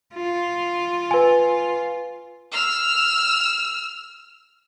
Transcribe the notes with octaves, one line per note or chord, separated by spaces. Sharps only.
F4
B4 G#5
E6 F6